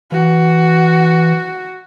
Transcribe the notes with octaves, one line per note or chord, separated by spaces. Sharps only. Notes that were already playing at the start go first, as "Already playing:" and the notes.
E3 F#4